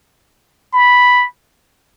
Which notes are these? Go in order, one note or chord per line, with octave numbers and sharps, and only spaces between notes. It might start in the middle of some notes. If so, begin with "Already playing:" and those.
B5